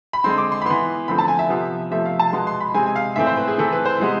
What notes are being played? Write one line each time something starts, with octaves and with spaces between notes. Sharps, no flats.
B5
D3 G#3 C4 C6
D6
C6
B5
E3 B3 C6
D3 F3 A3 C4 B5
A5
G#5
E5
C3 F3 B3
C3 F3 A3 E5
F5
A5
B2 G#3 B3 C6
C6
B5
C3 G#3 C4 G#5
G#5
F5
A2 E3 A3 C4 E5
C5
B4
G#4
E3 A3 C4 A4
B4
C5
C3 G#3 B3